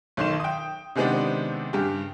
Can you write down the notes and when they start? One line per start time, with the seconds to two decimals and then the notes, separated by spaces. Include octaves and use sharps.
0.17 B1 D#3 C6 E7
0.40 G5 D#6
0.95 C3 D#3 G#3 B3 C4 D4
1.73 G2 C#3 G4